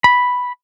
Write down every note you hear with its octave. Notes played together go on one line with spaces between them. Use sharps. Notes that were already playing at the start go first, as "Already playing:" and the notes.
B5